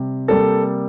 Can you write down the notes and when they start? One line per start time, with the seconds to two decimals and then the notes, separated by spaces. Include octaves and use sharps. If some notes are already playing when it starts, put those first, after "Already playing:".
Already playing: C3 G3
0.28 C3 G3 A#3 A4